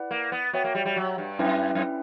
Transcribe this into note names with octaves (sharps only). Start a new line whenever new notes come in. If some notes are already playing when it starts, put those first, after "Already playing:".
Already playing: E4 B4 D5 F#5
A#3
B3
B3 F#4 C#5 E5 G5
A#3
G3
G3
F#3
G2
F#2 C#4 E4 B4 E5 G5
F#2